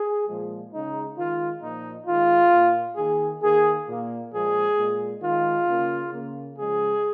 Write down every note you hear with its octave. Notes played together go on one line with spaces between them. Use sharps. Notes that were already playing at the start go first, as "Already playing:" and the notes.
Already playing: G#4
A#2 F3 G#3
C#3 G#3 D#4
D#3 G#3 F4
A#2 F3 A#3 D#4
D#3 G#3 F4
A#2 A#3
D#3 A#3 G#4
D#3 A#3 G#4
A#2 A#3
A#2 F3 G#3 G#4
A#2 G#3
D#3 G#3 F4
C#3 A#3
C#3 A#3
C#3 F3 G#3 G#4